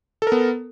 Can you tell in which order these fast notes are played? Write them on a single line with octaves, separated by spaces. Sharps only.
A4 A#4 B3